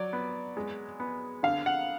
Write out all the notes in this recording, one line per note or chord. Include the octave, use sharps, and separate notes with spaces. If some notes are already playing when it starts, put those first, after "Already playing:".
Already playing: F#3 D5
B3
G#3
B3
D3 F5
F#5